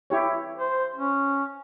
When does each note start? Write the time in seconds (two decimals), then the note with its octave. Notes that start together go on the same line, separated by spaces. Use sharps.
0.10 E4 G4 C#5
0.58 C5
0.96 C#4